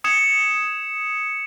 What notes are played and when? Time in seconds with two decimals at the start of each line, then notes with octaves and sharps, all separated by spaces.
0.04 D#6 G#6 C#7 E7